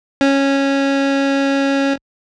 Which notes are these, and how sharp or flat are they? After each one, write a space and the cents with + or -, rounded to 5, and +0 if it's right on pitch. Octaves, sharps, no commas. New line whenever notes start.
C#4 -10